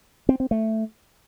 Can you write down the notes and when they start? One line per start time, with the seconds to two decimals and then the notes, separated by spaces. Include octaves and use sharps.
0.29 C4
0.40 C4
0.51 A3